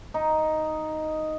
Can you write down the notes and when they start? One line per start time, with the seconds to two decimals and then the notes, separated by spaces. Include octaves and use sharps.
0.14 D#4